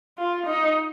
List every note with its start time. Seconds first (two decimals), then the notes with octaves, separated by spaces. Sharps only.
0.18 F4
0.46 D#4